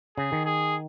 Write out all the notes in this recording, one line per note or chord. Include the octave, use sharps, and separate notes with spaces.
C#3 G#4
D#3
G#4